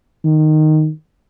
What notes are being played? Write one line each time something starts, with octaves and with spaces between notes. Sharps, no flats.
D#3